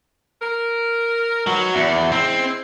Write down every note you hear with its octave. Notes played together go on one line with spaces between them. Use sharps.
A#4
B2 D#3 F#3
E2 A3 F#4 D5
G#3 C4 E4